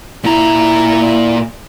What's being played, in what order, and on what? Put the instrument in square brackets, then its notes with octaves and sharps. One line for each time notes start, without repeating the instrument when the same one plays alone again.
[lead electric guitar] A#2 A#5 [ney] E4